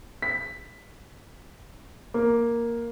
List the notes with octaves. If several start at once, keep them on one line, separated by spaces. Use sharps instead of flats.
B6
A#3